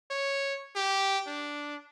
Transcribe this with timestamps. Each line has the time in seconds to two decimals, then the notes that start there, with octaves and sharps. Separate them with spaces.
0.11 C#5
0.76 G4
1.27 D4